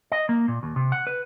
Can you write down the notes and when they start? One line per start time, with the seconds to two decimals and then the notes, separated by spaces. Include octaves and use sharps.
0.12 D#5
0.29 A#3
0.48 A#2
0.63 D#2
0.76 C3
0.92 F#5
1.07 B4